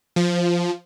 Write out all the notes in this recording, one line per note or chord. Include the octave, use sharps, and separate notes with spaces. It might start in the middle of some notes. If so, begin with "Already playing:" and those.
F3